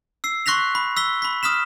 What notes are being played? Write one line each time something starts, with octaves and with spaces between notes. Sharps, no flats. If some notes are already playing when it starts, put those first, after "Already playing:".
E6 C7
C6 C#6 F#6 A#6 B6 F7
B5
E6 B6 G7
B5 B6
D#6 F6 B6 E7